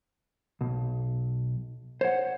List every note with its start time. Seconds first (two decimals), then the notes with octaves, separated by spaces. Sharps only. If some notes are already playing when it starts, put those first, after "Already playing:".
0.61 B1
2.01 C5 C#5 F#5